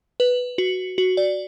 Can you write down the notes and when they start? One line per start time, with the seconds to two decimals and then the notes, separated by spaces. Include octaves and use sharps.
0.20 B4
0.58 F#4
0.98 F#4
1.17 D5